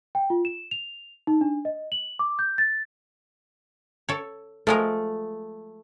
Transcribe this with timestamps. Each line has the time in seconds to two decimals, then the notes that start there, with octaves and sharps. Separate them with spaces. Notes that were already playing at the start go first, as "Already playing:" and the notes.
0.15 G5
0.30 F4
0.45 E7
0.71 F7
1.27 D#4
1.41 D4
1.65 D#5
1.92 F#7
2.19 D6
2.39 G6
2.58 A6
4.09 A4 C#5
4.67 F3 G#3 A3 A#4